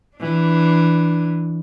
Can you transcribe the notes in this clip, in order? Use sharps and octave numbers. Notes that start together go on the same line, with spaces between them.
E3 D4